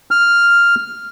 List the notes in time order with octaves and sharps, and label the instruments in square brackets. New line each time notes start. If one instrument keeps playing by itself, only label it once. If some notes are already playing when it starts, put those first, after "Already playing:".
[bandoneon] F6